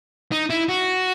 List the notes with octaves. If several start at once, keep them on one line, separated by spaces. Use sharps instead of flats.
D#4
E4
F#4